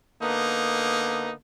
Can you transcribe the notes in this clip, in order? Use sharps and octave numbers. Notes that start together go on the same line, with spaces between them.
D3 A#3 B3 D#4